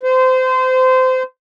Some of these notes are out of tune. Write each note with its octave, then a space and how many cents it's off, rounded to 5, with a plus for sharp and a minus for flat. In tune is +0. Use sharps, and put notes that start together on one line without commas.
C5 -25